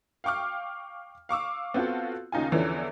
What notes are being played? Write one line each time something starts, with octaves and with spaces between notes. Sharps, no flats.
F5 G5 C#6 D6 F6
F5 C#6 D6 E6
B3 C4 F4 F#4 A4
D#2 C#3 D#4 F4 G#5
E2 D3 E3 F3 C#4